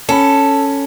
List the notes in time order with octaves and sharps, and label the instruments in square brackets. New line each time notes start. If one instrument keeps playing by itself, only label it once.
[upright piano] C#4 B5 [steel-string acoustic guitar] A4